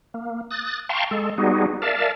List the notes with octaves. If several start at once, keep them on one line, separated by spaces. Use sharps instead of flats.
A#3
D#6 F#6 A6
F5 G5 A5 A#5 C6 C#6
G#3 A4
G3 B3 D#4 F#4 G#4
A#4 D5 E5 F5 A5